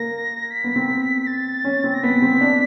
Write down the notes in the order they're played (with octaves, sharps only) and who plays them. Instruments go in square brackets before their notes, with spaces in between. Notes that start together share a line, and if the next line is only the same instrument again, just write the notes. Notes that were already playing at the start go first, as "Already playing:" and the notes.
Already playing: [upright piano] A#3 [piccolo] A#6
[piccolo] B6
[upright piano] B3
C4
[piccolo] A6
[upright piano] C#4
C4
[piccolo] A#6
[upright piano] B3 [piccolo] B6
[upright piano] C4
D4